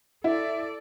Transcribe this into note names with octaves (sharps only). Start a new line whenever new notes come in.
E4 A4 D5